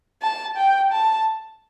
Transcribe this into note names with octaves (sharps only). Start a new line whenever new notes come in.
A5
G5
A5